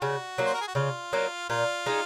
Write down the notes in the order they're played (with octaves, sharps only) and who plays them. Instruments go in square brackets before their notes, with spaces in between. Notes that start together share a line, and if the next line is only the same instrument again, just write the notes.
[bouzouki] C#3 [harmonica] F#4
[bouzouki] F#3 A#3
[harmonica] C5
A#4
G#4
F#4
[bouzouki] C#3 [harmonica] F4
[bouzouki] F#3 A#3
[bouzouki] A#2 [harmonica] F4
[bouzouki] G#3 D#4